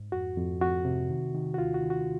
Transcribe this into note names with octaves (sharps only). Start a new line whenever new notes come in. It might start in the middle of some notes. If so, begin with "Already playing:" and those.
Already playing: G#2
F2 F#4
F2
F2 F#4
C3
D#3
D#3
F#4
D#2 F4
F#4
D#3
F#4